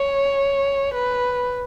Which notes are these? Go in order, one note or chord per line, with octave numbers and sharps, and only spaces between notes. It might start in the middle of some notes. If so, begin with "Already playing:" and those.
Already playing: C#5
B4